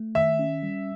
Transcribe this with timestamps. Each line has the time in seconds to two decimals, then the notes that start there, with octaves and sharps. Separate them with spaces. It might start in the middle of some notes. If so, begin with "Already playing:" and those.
Already playing: A3
0.15 D#3 E5
0.39 C#4
0.63 G3